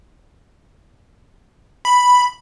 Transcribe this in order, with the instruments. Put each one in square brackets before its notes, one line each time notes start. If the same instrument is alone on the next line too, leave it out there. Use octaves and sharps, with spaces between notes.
[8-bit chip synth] B5